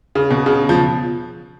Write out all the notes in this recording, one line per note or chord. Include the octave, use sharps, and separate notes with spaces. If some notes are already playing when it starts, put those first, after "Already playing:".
C#3
B2
C#3
F3